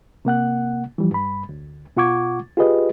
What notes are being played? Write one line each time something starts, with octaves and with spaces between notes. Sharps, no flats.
C3 A#3 F#5 F#6
E3 F3 G3
G2 B5
D2
B2 F4 F#5 C#6 D6 G#6
F4 G4 G#4 B4 D#5